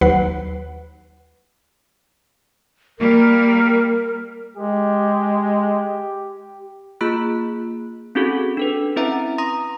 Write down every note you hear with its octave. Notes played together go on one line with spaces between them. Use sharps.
D#2 F#3 B4 F#5 C7
G3 A#3 A#4
G#3 G4
A#3 F4 G#4 B5 F#6
C4 C#4 D#4 F#4 G#4 A4
D4 A4 B4
C4 C#4 E4 B4 E5 A#5
A#5 C6 D#6 A#6